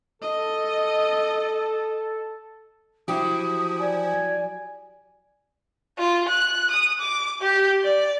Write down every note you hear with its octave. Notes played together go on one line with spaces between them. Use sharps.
A4 D#5
F3 F#3 E4 G4 D#6
D5 G#5
F4
F#6
D#6
D6
G4
D5